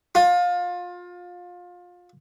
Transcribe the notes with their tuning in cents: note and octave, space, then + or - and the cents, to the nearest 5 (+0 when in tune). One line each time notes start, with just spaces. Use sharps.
F4 +25